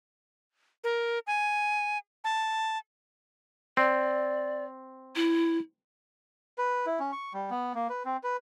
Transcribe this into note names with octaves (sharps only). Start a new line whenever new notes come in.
A#4
G#5
A5
C4 D5
E4
B4
E4
C#4
C#6
G3
B3
A#3
B4
C4
B4